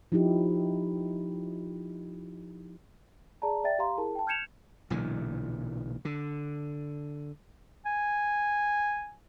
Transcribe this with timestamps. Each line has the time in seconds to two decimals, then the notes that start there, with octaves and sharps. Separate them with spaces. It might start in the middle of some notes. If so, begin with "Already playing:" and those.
0.12 F3 D#4 E4 G4
3.42 G#4 D5 A5 A#5
3.64 D5 E5 G5 A6
3.78 G4 F5 A#5 C6
3.97 E4 G#4 A#4 A5
4.15 G5 A5
4.27 F6 G6 G#6 C#7 E7 F7
4.90 B1 A#2 D3 E3
6.05 D3
7.86 G#5